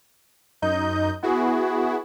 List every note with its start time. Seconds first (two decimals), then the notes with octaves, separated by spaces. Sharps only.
0.62 F#2 D#4 D#5 G6
1.23 B3 E4 F#4 G#4